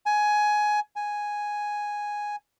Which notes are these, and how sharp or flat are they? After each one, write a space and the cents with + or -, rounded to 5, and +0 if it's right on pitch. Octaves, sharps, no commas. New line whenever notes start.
G#5 +15
G#5 +0